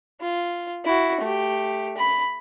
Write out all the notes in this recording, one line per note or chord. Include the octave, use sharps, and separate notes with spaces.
F4
E4 F#4
A3 G4
B5